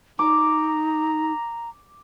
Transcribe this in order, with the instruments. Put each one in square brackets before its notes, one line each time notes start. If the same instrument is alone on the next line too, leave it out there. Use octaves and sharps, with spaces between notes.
[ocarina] D#4 [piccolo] A#5 [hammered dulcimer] D6